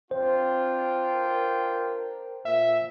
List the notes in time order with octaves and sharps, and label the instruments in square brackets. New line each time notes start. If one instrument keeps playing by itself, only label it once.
[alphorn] C4 [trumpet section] D4 F4 G5 [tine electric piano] C5
[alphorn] A#4
[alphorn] A#2 [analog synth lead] E5